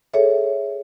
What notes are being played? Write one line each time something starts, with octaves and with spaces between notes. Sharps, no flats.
G#4 A4 C#5 E5